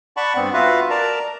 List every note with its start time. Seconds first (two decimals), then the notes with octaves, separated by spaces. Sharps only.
0.17 D5 F#5 A5 B5 C#6
0.36 G2 B3 C4
0.54 F4 F#4 B4 E5 F5
0.90 A#4 D5 A5 A#5